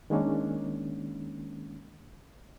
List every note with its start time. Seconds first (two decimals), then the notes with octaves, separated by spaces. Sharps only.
0.10 D#3 G#3 A#3 C#4 D4